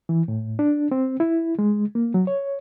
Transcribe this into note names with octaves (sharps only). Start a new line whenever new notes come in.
E3
A2
D4
C4
E4
G#3
A#3
F#3
C#5